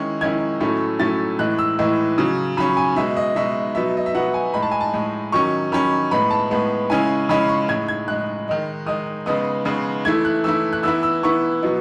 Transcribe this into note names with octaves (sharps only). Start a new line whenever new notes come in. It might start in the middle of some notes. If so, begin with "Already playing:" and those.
Already playing: D#3 G#3 C#4 E4
D#3 G#3 C#4 E4 G#6
A2 F#3 A3 C#4 E4
A2 F#3 A3 C#4 E4 A6
A2 E3 G#3 D#4 F#6
E6
A2 E3 G#3 D#4
C#3 F#3 C#4
C#3 F#3 C#4 B5
G#5
B2 G#3 D#4 E5
D#5
B2 G#3 D#4 E5
B2 F#3 B3 D#4 E5
D#5
E5
B2 F#3 B3 D#4 F#5
G#5
A2 G#3 D#4 B5
A5
G#5
A5
A2 G#3 D#4
D#3 F#3 C#4 C#6
D#3 F#3 C#4 B5
A2 G#3 B3 B5
A5
A2 G#3 B3
C#3 G#3 C#4 E4 G#5
C#3 G#3 C#4 E4 B5
C#6
A2 G#3 D#4 G#6
G#6
A2 G#3 D#4 F#6
D#3 G#3 D#4
D#3 G#3 D#4 D#6
C#3 G#3 B3 D#4 D#6
C#3 G#3 B3 D#4
E3 A3 E4 G#6
F#6
E3 A3 E4 E6
F#6
E3 B3 E4 E6
E6
E3 B3 E4 C#6
B2 F#3 B3 D#4